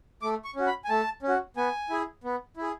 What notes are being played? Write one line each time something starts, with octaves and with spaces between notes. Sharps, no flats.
A3 D6
C#6
C#4 F#4
B5
G#5
A3 A5
C#4
F#4
B3 G#5
E4 G#4
B3
E4 G#4